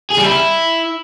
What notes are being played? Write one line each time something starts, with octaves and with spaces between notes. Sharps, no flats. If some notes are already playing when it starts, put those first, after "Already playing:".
G#4
G3
E4